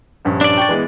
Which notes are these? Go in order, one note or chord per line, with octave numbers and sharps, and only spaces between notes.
A#1 G2 C#4
D4 D5
G5 C#6 A6
E3 G#3 B3